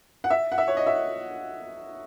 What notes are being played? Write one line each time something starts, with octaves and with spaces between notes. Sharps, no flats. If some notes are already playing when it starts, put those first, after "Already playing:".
F#5
E5
F#5
E5
C#5
D#5
E5